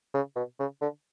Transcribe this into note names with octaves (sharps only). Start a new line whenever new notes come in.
C#3
B2
C#3
D3